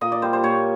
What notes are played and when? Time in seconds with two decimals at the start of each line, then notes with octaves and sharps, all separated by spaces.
0.01 A#2 D#5
0.12 D5
0.22 G3 C5
0.33 C5
0.43 A#2 C#5